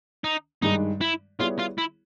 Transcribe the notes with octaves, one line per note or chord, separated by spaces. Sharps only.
D#4
G2 D#3 G#3 D#4
E4
G3 B3 E4 F4 G#4 C#5
F4
E4